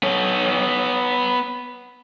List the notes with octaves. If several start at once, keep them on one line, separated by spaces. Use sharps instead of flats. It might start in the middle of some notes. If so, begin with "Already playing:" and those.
B3 C#5